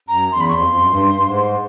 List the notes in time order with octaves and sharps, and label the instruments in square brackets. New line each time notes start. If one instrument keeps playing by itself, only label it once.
[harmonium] F#2 [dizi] A#5
[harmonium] E2 [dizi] C6
[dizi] B5
C#6
[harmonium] F2 [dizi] C6
[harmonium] F2
F#2
G2
G2
G#2